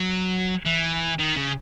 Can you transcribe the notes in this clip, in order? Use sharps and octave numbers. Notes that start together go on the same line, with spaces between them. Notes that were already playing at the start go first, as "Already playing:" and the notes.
Already playing: F#3
E3
D#3
C#3